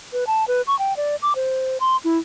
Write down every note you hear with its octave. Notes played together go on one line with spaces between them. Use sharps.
B4
A5
B4
C#6
G5
D5
D6
C5
C6
E4